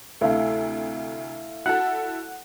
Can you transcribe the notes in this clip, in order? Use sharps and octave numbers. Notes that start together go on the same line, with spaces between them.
D2 C3 A3 E4 F5
E4 F#4 A4 F#5